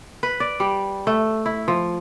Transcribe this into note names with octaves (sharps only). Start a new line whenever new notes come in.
B4
D5
G3
A3
E4
F3